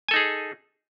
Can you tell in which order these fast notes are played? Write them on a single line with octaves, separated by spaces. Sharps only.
G#5 A4 D#4 G#4